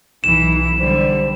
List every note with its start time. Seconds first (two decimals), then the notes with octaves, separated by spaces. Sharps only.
0.24 B1 E3 D#4 E7
0.79 D3 G3 C5